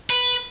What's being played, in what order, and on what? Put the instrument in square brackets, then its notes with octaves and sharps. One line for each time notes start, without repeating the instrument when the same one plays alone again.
[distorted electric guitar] B4